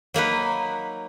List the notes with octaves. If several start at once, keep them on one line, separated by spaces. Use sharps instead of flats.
F#3 A#3 D#4 B4